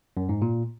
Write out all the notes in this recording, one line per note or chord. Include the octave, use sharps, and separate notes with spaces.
F#2
G#2
A#2